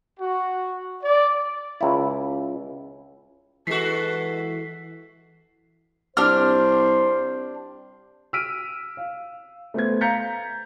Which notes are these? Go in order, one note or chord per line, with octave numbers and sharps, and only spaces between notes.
F#4
D5
C#2 E4
E3 G#3 F#4 A4 B6 C7
C2 D4 G4 C5 F6
E6 F6 B6 D7 D#7
F5
A3 B3 C5 G#6
F5 A#5 G6 A6 B6 C#7